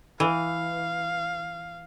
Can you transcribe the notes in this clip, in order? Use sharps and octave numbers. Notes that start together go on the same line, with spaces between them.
E3 F5